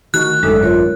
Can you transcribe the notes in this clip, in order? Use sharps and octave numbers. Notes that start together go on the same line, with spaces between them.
D3 D#3 A3 F#4 F#6
G#1 F#2 G#3 D4 D#4 A4
F4 A#4 C#5